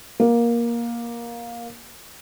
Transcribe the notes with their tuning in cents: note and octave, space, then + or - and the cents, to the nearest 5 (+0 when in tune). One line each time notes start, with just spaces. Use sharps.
A#3 +15